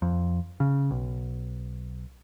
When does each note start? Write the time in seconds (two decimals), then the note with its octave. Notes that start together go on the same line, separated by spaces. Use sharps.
0.02 F2
0.60 C#3
0.91 B1